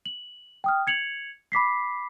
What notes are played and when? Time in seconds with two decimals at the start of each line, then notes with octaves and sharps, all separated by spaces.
0.06 F#7
0.64 G5 D#6 F6
0.87 G#6 C#7 F7 F#7
1.52 B5 D6 B6 C7